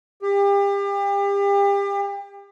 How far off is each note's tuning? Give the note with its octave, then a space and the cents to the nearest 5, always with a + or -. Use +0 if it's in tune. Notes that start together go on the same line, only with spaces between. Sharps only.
G4 +35